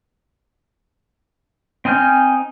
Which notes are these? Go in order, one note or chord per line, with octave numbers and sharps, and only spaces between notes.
C4 D#4 G#5 F6 G6